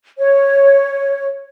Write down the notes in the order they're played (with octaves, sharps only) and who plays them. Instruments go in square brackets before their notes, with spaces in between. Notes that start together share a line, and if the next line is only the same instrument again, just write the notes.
[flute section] C#5